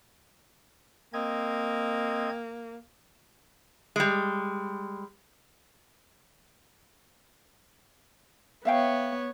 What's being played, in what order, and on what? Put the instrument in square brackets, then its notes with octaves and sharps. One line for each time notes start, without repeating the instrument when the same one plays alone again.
[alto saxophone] A#3 [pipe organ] C4 D#5 G#6
[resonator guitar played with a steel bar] G3 G#3
[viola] B3 C#5 [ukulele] E5 F5 G5